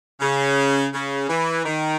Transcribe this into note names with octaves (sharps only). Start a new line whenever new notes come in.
C#3
C#3
E3
D#3